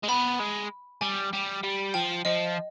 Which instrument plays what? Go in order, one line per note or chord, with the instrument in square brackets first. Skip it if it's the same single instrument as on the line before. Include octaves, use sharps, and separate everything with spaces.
[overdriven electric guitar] G#3
[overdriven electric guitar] B3 [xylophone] B5
[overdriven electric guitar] G#3
[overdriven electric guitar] G3 [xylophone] G#5
[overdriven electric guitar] G3
G3
[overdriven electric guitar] F3 [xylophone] G5
[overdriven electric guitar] F3 [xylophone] D#5